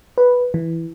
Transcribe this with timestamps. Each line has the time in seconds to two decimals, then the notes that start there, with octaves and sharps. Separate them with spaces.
0.18 B4
0.54 E3